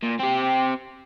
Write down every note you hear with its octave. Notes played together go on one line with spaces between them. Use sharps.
A#2
C4 G4